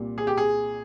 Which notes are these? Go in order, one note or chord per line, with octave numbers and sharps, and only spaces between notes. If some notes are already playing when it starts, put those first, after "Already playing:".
Already playing: C2 A#2 G3
G#4
G4
G#4